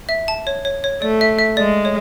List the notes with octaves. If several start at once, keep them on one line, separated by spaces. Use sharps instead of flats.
E5
A5
C#5
C#5
C#5
A3 D5
E5
E5
G#3 D5
C#5